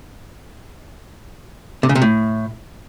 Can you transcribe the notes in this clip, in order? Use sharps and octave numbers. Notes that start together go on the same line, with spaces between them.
C3
C#3
C3
A2